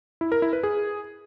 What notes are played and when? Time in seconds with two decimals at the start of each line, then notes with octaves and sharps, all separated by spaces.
0.21 E4
0.32 A#4
0.42 E4
0.53 B4
0.63 G#4